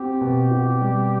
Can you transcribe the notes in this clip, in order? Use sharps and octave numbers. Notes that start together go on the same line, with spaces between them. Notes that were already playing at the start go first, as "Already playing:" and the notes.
Already playing: C4 F#4 G4
B2
F#4
G3